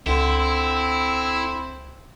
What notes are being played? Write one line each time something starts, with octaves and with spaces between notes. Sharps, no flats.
C#2 D3 C4 E4